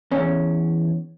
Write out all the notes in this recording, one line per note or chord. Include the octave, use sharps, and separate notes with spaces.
E2 C#4